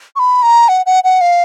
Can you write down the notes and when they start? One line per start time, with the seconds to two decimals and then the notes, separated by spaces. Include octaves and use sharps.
0.16 C#6
0.19 B5
0.43 A#5
0.69 F#5
0.86 F#5
1.04 F#5
1.21 F5